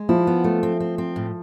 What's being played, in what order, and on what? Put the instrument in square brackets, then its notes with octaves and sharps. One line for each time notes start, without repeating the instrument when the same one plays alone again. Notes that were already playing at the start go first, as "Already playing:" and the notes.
Already playing: [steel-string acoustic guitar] G#3
[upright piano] F3 [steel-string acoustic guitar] E4
[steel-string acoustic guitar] B3
A3
C4
C4
C4
A2